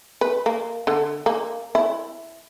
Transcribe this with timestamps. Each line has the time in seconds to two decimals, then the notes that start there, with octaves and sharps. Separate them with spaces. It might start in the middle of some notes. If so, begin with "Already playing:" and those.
0.21 B4
0.46 A#3
0.87 D3
1.26 A#3
1.75 E4